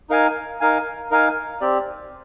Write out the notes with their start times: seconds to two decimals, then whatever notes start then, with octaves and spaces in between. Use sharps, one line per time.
0.10 D#4 A#4 F5 G#5
0.61 D#4 A#4 F5 G#5
1.11 D#4 A#4 F5 G#5
1.61 C4 G4 D5